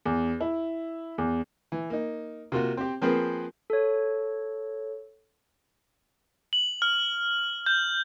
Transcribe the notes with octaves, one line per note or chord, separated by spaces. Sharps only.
E2
E4
E2
E3
A#3 D#4
C3 A#3 F4 F#4
C4 G4
F3 A#3 C4 G#4 A#4 B4
A4 C#5
F#7
F6
G6